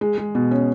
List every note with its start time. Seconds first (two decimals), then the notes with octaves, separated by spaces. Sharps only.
0.01 G#3
0.18 G#3
0.35 B2
0.51 C#4